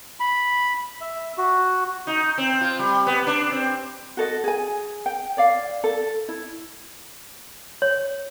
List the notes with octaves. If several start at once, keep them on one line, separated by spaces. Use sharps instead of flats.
B5
E5
F#4
D#4
C4
F4
G3
B3
D4
C4
F#4 A4 D#5
G#4 G#5
G5
C#5 D5 F5
A4
E4
C#5